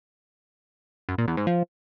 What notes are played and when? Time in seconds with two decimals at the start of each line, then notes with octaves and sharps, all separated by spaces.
1.09 F#2
1.18 A#2
1.28 E2
1.37 G#2
1.47 F3